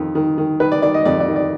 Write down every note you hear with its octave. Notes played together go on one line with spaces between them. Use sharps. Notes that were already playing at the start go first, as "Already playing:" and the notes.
Already playing: F2 D#3
D#3
D#3
D#3 B4
D5
D#3 D5
D#5
F2 D5
D5
D#3
D5